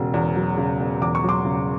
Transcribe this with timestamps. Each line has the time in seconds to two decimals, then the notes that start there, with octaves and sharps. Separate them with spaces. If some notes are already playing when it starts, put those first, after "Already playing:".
Already playing: E1 C#3
0.14 E2
0.36 F#3
0.58 C#3
0.80 E1
1.02 E2 D6
1.15 C#6
1.24 F#3 C6 D6
1.45 C#3